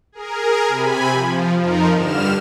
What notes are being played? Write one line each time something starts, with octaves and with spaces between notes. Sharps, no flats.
G#4 A#4
C3 G#5 B5
F3
F2 F3 D#4 A#4
G2 D3 F6 E7